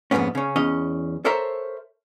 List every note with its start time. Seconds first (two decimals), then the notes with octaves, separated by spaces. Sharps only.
0.11 F2 G#2 C3 A#3 B3 C#4
0.35 C#3 C#4
0.56 E2 C#4 D#5
1.25 A4 A#4 C5 C#5 E5 A#5